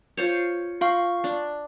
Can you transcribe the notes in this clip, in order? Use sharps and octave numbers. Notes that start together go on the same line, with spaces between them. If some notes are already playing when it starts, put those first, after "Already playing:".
F4 C5 C#5
F4 F5 C6 C#6
D4